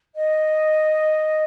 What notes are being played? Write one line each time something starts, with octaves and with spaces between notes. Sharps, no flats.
D#5